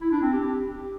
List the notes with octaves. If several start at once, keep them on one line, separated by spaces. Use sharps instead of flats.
E4
D4
C4
G4